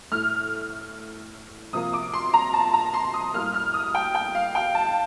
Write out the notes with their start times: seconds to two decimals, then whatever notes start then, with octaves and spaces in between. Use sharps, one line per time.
0.12 A2 A3 F6
1.73 C3 F3 A#3 D#6
1.93 D6
2.13 C6
2.34 A#5
2.53 A5
2.73 A#5
2.94 C6
3.14 D#6
3.34 A2 G3 A#3 F6
3.54 F6
3.74 D#6
3.95 G5
4.15 G5
4.35 F5
4.55 G5
4.75 A5